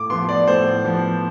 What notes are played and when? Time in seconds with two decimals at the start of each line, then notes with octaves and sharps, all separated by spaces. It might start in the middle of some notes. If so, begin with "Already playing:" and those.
Already playing: A2 D6
0.10 F3 B3 C6
0.29 D5
0.47 A2 C5
0.85 F3 B3